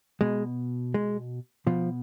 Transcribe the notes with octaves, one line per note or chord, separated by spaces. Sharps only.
B2 G#3
G#3
B2 F3